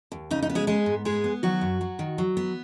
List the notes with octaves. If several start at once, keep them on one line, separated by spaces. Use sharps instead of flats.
D#2
C#3 D#4
D#4
B3
G#3 G#4
G#3 B3 G#4
G#2
G#3 B3 G#4
B3
D#3 F#3 F#4
F#2
F#3
D#3
F#3
B3